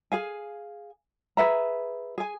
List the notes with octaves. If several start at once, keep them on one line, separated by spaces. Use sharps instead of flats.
G#4 F5 G#5
G#4 B4 E5 A#5
G#4 G#5